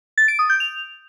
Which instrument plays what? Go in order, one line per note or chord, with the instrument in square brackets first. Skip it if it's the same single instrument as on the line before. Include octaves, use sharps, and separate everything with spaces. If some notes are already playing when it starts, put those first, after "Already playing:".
[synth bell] A6
D7
D#6
G6
F7